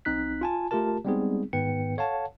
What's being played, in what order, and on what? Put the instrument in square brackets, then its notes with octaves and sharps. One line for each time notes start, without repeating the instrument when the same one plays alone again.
[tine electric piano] B1 C4 D#4 F#6 B6
F4 G#5 A5
A3 F4 G4 A#4 A5
G3 G#3 B3 C4 D#4 G#4
G#2 D#3 B3 B4 G5 C#7
A4 C#5 F5 F#5 A5